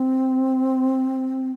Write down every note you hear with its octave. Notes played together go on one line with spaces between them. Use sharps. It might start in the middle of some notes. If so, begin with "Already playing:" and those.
Already playing: C4